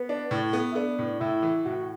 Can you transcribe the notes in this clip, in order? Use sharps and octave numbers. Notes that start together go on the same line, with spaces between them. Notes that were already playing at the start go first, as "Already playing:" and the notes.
Already playing: B3
D4
A2
B3
E4
B3 D4
A2
A2 E4
E3
A2 F#4